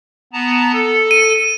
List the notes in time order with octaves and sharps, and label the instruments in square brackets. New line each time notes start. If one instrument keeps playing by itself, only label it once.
[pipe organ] B3 A5 A#5
A4
[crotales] D#7